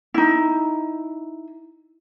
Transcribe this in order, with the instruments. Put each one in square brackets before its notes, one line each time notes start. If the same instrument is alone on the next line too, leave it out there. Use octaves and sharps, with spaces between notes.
[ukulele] D#4 E4